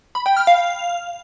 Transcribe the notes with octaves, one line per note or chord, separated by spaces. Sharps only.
B5
G5
F6
F5